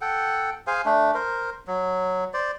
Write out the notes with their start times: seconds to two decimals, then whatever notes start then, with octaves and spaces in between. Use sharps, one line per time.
0.01 A4 F#5 G5
0.67 G#4 C5 F5 G#5
0.85 A3 D4
1.14 A#4 C5
1.68 F#3
2.34 C5 D5